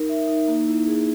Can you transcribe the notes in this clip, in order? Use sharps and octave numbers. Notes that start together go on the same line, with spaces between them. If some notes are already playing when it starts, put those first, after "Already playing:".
Already playing: D#4 A#4
E5
D#4
A#3
E4
G#4